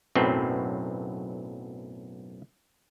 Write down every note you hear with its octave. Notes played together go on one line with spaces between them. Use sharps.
B1 F#2 A2 F#3 C4 B4